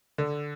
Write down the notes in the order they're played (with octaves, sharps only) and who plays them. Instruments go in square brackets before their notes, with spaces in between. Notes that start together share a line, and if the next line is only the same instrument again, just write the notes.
[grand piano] D3